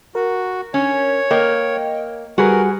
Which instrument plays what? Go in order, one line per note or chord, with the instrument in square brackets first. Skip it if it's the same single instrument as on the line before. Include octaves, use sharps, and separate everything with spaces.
[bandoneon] F#4 [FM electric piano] A#4
[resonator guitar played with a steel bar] C#4 [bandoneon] C#5
[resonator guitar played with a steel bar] A#3 A#4 [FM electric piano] D#5 G5
[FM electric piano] G3 [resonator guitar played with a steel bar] F#4 G#4 B4 [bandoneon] A#4